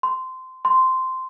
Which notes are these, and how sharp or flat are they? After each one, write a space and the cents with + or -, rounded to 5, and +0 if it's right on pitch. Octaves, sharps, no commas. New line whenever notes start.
C6 -15
C6 -10